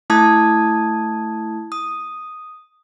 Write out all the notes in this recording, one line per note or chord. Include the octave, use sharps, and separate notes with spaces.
A3 E4 A5 D#6 G#6
D#6